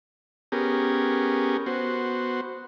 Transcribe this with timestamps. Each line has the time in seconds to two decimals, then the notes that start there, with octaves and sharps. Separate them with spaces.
0.52 B3 C#4 G4 G#4 A#4
1.66 B3 F#4 C5